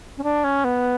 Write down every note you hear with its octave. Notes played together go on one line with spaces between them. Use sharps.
C#4
D4
C#4
B3